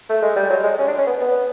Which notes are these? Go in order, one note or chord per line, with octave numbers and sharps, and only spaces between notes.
A3
G#3
G3
F#3
G#3
C#4
D4
C#4
B3
B3